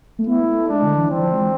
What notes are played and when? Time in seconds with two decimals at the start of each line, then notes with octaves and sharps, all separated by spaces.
0.19 A3
0.27 B3 E4
0.40 A3
0.54 A3
0.68 G#3 D4
0.83 D3
0.97 E3
1.11 E3 C4
1.21 F3
1.32 G#3